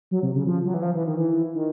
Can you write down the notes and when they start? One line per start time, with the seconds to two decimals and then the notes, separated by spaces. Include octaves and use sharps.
0.11 F#3
0.23 C3
0.35 C#3
0.46 F3
0.65 F#3
0.74 E3
0.82 F3
0.95 E3
1.06 D#3
1.17 E3
1.54 D#3